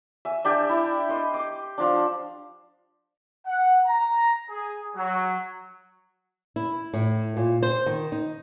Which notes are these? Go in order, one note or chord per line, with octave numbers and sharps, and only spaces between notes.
E5 G#5
D4 G4 E5 G5
E4
D#5 C6
D6
F3 D4
F#5
A#5
G#4
F#3
E4
A2
A#2
C5
D#3
D#4